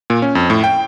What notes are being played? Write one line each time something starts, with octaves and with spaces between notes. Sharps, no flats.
A#2
C#4
F2
A2
G5